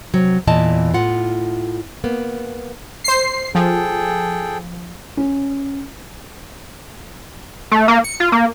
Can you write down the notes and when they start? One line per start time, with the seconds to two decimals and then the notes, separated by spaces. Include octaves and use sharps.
0.13 C3 F#3
0.47 E2 A#2 E3 D#5 A5
0.94 A2 F4 F#5
2.04 A#3 B3
3.04 C5 C7
3.55 F3 G#4 A4 G5
5.17 C#4
7.71 A3
7.88 A#3
8.04 C#7
8.20 F4
8.32 A#3